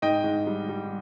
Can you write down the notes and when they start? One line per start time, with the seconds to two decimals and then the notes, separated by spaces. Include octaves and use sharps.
0.02 G#2 D#5 G5
0.24 G#2
0.47 G3
0.69 G3